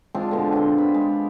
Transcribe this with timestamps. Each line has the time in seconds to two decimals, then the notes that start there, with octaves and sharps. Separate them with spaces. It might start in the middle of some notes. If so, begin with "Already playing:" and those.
0.15 G#3 C4 D4 F4
0.31 B2 D3
0.53 C4 C6
0.78 B5
0.94 G#3